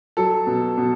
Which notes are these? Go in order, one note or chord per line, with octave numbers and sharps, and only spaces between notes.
F#3 A4
B2
B2